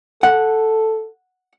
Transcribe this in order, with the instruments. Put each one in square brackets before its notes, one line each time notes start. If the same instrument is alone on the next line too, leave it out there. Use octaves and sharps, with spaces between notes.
[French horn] A4 [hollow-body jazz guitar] F#5